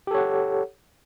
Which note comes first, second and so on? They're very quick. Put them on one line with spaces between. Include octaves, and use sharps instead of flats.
G4 A4 C#5 F#5